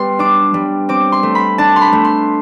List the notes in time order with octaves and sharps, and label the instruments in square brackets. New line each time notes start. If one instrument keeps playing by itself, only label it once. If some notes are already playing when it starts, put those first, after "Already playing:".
Already playing: [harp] G3 B3 C6
D4 D6
G3
C4 D6
C6
A3
B5
D4 A5
C6
B5
A3
C6